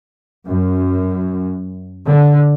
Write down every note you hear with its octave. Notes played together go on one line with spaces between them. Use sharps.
F#2
D3